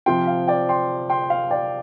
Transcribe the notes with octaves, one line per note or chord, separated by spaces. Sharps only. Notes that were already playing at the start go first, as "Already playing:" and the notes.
C3 F3 C4 G5 C6
F5
D5 G5
G5 C6
G5 C6
F5
D5 G5